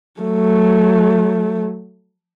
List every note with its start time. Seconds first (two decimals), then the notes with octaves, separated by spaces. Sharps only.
0.21 F#3 A3